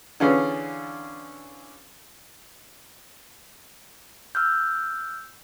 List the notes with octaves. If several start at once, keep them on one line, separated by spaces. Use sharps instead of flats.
D3 E3 C#4 F4 G#4 D5
E6 F6 G6